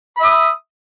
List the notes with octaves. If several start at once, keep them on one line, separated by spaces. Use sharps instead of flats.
E5 B5 D#6